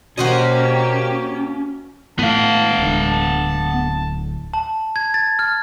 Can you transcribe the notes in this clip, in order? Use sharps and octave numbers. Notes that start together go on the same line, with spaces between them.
B2 A#3 C#4 F#4 G4 C5 D#5
A2 B3 F5 A5
D1 D3
A5
G#6
A6
F6